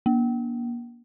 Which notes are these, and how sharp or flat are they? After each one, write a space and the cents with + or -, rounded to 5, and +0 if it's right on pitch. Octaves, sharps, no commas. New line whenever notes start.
A#3 +35